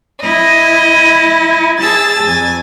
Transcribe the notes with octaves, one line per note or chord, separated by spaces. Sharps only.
E4 D#5
G#4 A5 E6 A6
F2 G#5